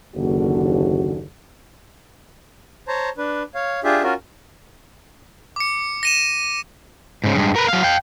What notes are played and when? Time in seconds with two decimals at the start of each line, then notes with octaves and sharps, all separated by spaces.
0.15 F#1 D#2 D3 F#4
2.88 C5 C#5 A5 A#5
3.18 D4 B4
3.55 C#5 F5
3.84 D4 F4 G4 G#4 E5
4.03 C#4 F4 F#4 A#4
5.56 D6 C#7
6.03 A#6 D#7 E7
7.24 G#2 C#3
7.36 G2 G#3
7.56 A#4 B4
7.68 F#3 F5
7.83 F5 G5